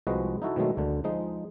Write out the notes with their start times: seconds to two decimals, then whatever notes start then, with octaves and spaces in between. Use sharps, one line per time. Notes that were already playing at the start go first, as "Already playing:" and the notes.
0.07 C2 F3 G#3 F#4 B4 D#5
0.42 D#4 E4 F#4 A4
0.56 B2 D#3 F#3 G#3 A3
0.77 D2 D3
1.04 F3 G#3 D#4